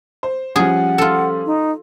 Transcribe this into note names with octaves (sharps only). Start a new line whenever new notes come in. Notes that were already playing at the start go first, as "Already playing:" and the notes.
C5
F3 G3 C#4 G#4 F#5
F4 A4
D#4